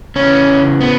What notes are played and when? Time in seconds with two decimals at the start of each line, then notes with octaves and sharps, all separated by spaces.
0.16 C#3 E3 C#4
0.81 B3